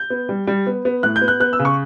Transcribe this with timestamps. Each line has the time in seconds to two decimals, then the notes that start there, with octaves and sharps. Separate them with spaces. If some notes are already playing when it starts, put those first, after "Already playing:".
Already playing: G6
0.10 B3
0.29 G3
0.47 G3
0.67 B3
0.85 B3
1.03 A2 F#6
1.16 G6
1.22 B3
1.28 F#6
1.40 B3 F#6
1.53 E6
1.59 C#3
1.65 C#6